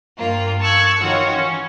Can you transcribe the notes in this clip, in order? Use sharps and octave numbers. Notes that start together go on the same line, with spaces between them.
G2 A#3 F4
A5 C#6 E6 F#6 G#6
D#3 F4 F#4 C#5
E3 C#4